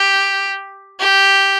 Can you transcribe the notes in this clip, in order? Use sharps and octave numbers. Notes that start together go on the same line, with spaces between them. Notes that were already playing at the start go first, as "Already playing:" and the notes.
Already playing: G4
G4